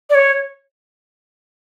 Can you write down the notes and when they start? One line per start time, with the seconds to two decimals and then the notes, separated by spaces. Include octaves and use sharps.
0.10 D5
0.15 C#5